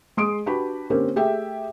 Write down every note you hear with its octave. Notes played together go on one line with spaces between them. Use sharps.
G#3 C6 D#6 D7
D4 F#4 G4 B4 B5
D3 A#3 C4 C#4 G4 A#4
A3 G4 G#4 E5 G5